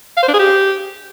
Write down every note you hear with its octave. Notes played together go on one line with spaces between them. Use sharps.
F5
C5
D4
G#4
G4